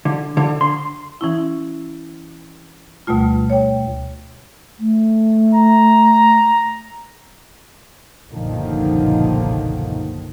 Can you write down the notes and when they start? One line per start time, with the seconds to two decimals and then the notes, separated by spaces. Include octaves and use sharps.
0.05 D3
0.37 D3
0.61 C6
1.21 E3 C#4 E4
3.07 D2 B2 G3 A3 F4
3.50 C#5 G5
4.79 A3
5.54 A#5
8.31 F#1 B1 A#2 D3 D#3 F3